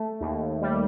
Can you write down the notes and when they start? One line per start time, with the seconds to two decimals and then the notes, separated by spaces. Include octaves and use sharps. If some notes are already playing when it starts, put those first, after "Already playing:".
Already playing: A3
0.21 D#2
0.62 G3